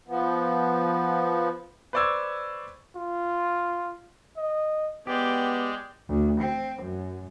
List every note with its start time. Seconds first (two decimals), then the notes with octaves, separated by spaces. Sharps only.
0.08 F3 B3
1.93 B4 C5 D5 C#6 E6 G#6
2.96 F4
4.37 D#5
5.07 G#3 B3 G4 D5 G5
6.09 D2
6.41 C4
6.82 F#2